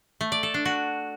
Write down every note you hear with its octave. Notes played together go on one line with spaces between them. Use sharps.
A3
D5
A4
D4
F#4